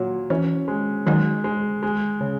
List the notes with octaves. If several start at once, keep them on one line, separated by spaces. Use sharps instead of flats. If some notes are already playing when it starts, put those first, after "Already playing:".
Already playing: A#2 F#3
E3 C#4
G#3
D#3 F#3 G#3
G#3
G#3
C#3